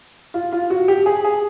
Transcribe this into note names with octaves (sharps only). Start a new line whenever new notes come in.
F4
F4
F#4
G4
G#4
G#4